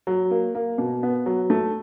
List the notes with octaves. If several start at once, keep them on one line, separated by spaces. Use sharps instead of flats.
F#3
A#3
A#3
B2
B3
F#3
A3